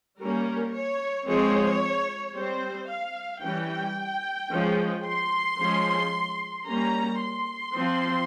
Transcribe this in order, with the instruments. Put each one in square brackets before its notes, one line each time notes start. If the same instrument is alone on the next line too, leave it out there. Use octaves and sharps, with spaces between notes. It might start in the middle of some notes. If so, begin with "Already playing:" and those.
[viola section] G3 A#3 C#4 A#4
C#5
F3 G#3 C4 C#5
G3 C4 C5
F5
E3 G3 C#4 G5
F3 G#3 C#4
C6
F3 G#3 C#4
G3 A#3 C#4 A#5
C6
F3 C4